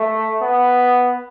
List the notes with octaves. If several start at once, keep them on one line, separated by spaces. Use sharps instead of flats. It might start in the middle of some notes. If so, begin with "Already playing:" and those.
Already playing: A3
B3